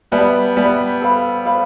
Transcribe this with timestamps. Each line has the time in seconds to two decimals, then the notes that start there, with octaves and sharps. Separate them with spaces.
0.12 G3 B3 B4 E5 A5
0.57 G3 B3 B4 E5 A5
1.01 A4 C5 F5 B5
1.45 A4 C5 F5 B5